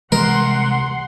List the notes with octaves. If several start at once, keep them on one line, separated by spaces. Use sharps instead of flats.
C2 E3 G#3 A#4 F#5 C6